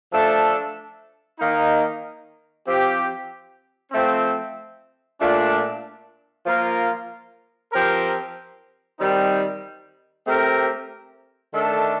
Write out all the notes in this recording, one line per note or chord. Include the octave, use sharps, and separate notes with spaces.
F3 A3 D4 A4
D#3 A#3 D#4
F3 C4 G4
F3 A3 C4
A#2 A3 D4 F4
F3 A#3 F4 A#4
F3 C4 G4 A#4
D#3 G3 C4 D#4
A3 C4 G4 A#4
D#3 A3 D4 A4